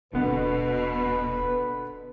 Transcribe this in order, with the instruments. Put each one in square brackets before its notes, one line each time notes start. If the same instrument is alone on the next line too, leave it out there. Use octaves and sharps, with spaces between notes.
[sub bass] D#1 [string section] B2 [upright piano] D3 B3 [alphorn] B4